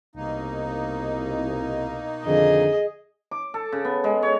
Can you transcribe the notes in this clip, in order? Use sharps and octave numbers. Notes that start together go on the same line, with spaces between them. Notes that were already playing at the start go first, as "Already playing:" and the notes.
C2 B2 A#3 D#4
F2 D3 D#3 G#4 D#5
D6
A4
C#3
B3
G#3
C#5